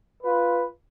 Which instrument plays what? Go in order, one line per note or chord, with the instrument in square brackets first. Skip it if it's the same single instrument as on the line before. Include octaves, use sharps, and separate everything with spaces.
[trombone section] F4 B4